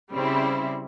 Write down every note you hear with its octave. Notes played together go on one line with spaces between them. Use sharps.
C#3 G3 C4 E4